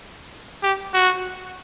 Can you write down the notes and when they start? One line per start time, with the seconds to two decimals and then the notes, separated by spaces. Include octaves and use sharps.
0.63 G4
0.94 F#4